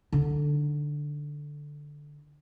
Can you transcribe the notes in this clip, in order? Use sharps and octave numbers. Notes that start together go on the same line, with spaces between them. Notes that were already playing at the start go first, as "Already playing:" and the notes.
D3 D#4